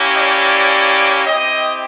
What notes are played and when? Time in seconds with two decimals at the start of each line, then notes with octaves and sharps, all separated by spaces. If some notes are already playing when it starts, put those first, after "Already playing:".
Already playing: A#3 C#4 E4 G4
0.17 D5
1.26 C4 E4 G4 D#5